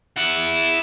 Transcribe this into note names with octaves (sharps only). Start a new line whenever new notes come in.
E4 F#5